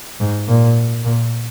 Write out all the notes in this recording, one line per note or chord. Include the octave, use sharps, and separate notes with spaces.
G#2
A#2
A#2